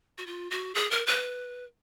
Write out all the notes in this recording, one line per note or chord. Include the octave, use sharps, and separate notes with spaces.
F#4
F4
F#4
G#4
A#4
B4